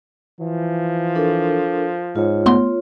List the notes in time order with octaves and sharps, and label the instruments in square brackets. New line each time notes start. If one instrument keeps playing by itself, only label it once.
[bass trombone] E3 [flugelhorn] F3
[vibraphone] D4 A4 A#4
[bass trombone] G#2 [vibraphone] F4 C#5
[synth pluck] A3 B3 C6